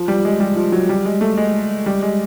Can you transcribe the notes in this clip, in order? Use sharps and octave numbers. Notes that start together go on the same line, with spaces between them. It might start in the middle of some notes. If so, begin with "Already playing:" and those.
Already playing: F3
G3
G#3
G3
F3
F#3
G3
G#3
A3
G#3
G3
G#3